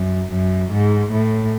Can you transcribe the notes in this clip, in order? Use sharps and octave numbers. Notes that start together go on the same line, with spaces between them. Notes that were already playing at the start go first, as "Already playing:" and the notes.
Already playing: F#2
F#2
G#2
A2